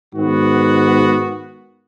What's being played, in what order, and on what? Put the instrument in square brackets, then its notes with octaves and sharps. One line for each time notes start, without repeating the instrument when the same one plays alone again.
[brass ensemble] G#2 D#3 B3 F#4